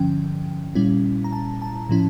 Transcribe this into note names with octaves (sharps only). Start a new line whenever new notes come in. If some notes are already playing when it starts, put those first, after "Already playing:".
Already playing: G2 D3 F3 C#4 G5
A#2 G3 C#4 E4
A#5
A5
A5
A2 F3 C#4 E4